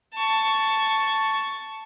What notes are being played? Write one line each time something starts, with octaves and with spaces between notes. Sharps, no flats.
A5 C#6